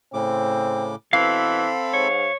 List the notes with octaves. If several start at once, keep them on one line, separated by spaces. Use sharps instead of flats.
A2 C#3 C4 D6
B2 E3 C4 A4 F5 B5
G#2 C#5